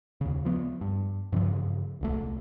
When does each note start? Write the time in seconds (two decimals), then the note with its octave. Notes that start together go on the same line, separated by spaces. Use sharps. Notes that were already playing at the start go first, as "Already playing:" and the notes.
0.21 D#2 C#3
0.45 F3 B3
0.81 G2
1.32 G2 C#3 E3 F3
2.01 D#1 C2 A3